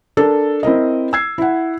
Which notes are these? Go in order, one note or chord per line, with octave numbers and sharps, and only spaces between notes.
D4 A4 A#4
C4 E4 A#4 D#5
E6 G#6 C7
E4 F#5